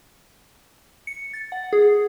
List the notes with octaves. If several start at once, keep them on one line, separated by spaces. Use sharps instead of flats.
C#7
A6
F#5
G#4